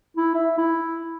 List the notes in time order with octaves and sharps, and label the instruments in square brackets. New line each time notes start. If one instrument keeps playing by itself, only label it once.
[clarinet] E4
E5
E4